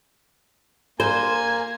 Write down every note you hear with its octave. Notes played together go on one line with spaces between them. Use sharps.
A#3 C5 G#5